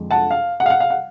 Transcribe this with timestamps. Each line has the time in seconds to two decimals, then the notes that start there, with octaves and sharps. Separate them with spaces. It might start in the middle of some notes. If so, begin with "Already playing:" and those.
Already playing: F2 D3 G#3
0.11 F#5 A5
0.31 F5
0.60 F#5
0.66 F5
0.70 F#5
0.80 F5
0.90 F#5